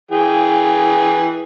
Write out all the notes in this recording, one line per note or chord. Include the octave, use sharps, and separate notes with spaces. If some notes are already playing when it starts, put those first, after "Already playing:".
E3 G#4 G5